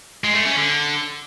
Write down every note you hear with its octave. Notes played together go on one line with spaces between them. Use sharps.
G#3
A3
C#4
D3